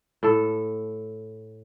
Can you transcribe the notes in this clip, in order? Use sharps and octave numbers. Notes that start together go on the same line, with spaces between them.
A2 A4